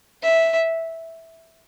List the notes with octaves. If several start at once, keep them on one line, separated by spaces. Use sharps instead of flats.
E5